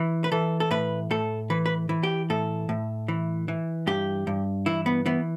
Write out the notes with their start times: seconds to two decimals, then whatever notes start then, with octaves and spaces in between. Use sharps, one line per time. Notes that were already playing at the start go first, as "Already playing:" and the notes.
Already playing: E3
0.24 B4
0.32 E3 A4
0.60 A4
0.71 A2 B4
1.11 A2 A4
1.50 E3 B4
1.66 B4
1.89 E3
2.03 G4
2.30 A2 A4
2.69 A2
3.08 E3
3.48 E3
3.87 G2 G4
4.27 G2
4.66 E3 E4
4.86 B3
5.06 E3 B3